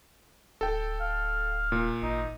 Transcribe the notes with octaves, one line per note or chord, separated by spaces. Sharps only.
D1 A4 G5
F5
A#2
G#1 D#4